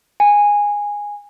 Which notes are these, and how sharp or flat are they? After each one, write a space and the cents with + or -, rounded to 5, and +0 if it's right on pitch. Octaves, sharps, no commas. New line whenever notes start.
G#5 -10